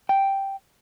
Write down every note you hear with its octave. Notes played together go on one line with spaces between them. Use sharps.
G5